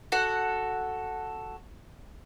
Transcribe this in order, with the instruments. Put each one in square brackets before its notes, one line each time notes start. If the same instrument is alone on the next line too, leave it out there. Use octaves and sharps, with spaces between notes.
[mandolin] F#4 A4 F#5